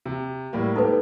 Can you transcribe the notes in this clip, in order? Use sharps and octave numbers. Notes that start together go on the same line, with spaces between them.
C3
A2 G3 A#3
G#2 D#4 G4 A4 B4